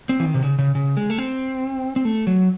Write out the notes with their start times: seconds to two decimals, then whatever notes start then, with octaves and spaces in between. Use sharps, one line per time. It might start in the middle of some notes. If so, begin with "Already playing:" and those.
0.09 C4
0.20 E3
0.25 D#3
0.34 C3
0.42 C#3
0.59 C#3
0.75 C#3
0.97 G#3
1.10 A3
1.18 C4
1.96 C4
2.05 A3
2.27 F#3